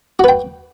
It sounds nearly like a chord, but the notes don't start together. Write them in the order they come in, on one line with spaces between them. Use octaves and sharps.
F#4 B4 G5